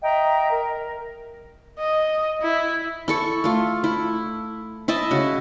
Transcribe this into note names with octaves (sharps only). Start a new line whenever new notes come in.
D#5 E5 G5 A#5
A#4
D#5
E4
E4 A4 C#6
A3 F4
E4
E4 D#5 E5 A5
C#3 F#4